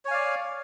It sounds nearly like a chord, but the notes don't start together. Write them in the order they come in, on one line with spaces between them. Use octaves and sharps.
C#5 G#5 F5 D5